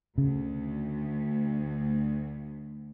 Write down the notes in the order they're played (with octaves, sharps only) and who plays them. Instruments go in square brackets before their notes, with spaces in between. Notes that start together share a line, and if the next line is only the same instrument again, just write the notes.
[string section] D2 [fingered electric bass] C#3